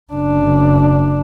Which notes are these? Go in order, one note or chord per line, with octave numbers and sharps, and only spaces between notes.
F#1 D4